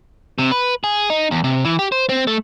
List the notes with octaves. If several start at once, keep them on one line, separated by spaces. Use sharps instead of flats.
C3
B4
G#4
D#4
E2
C3
E3
G4
C5
C4
A3